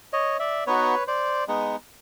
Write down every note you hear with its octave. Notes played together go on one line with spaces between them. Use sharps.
C#5 D#5
D5 E5
B3 D#4 F#4 B4 C#5
C5 D5
G#3 B3 D#4